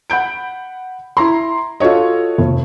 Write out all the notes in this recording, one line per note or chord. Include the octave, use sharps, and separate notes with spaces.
F#5 B5 G6 D7
E4 A#5 C6
F4 F#4 A4 C#5 D#5
F1